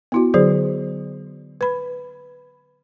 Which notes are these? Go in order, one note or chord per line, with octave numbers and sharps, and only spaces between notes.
B3 E4 F#4
D3 F#3 G#4 C5
B4 B5